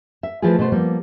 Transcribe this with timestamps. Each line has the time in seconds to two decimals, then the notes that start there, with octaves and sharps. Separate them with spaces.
0.23 E5
0.42 E3 F3 A3 E4 F4 G#4
0.59 B2 A3 C5
0.72 F3 G3 A#3 B3